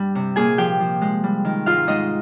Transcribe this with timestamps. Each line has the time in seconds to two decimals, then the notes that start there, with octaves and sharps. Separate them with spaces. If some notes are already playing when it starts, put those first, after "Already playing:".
Already playing: G2 G3 G4 G5
0.15 C3
0.36 A#2 G#4 G#5
0.58 F3 G4 G5
0.80 F3
1.01 G#3
1.24 G3
1.45 D#3
1.66 G#2 F4 F5
1.88 G#2 D#4 D#5